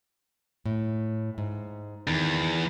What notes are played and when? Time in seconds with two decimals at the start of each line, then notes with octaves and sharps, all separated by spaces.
0.66 A2
1.38 G#2
2.08 E2 D#3